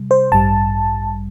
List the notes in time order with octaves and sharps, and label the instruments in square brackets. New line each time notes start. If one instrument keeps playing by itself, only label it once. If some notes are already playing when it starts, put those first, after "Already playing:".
Already playing: [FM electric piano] C3 G3
C5
A1 G2 G3 A5